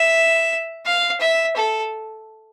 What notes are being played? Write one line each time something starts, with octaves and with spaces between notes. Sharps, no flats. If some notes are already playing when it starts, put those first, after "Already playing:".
Already playing: E5
F5
E5
A4